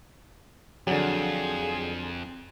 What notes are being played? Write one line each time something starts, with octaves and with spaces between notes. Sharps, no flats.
F2 D3 F#3 G#4